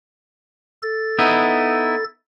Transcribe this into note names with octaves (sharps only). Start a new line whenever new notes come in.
A4 A6
B3 D#4 E4